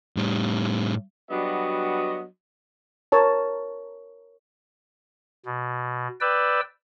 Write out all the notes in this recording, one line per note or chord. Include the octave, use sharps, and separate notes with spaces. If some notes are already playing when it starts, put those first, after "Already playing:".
A2 G3
F#3 G3 B3 D4 F#4 D#5
A#4 C#5 A5
B2
B4 D5 G5 E6